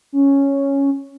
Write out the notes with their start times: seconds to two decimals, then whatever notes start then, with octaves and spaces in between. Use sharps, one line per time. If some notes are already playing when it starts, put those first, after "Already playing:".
0.13 C#4